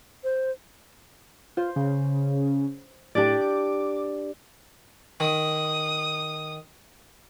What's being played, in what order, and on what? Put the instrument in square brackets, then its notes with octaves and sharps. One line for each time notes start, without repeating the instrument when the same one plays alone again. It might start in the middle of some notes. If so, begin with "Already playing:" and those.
[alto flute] C5
[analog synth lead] F4 [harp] C5
[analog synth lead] C#3
[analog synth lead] A2 [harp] D4 G4 D5
[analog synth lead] D6
[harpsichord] D#3 [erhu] D#6